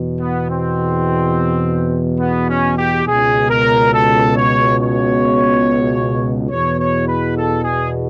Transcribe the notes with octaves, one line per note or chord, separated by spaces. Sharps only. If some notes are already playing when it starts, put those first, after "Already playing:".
Already playing: E2 B2
B3
C4
B3
C#4
G4
C#2 B2 G#4
A#4
A4
C#5
C#5
E2 B2 C#5
C#5
B4
A4
G#4